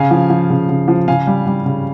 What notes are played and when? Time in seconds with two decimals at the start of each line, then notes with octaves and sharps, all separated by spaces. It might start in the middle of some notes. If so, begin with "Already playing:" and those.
Already playing: C#3 F5 G#5
0.11 F3
0.30 F3
0.50 C#3
0.69 C#3
0.88 F3
1.08 C#3 F5 G#5
1.27 G3
1.47 G3
1.66 C#3